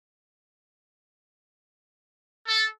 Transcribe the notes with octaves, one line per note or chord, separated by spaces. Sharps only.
A4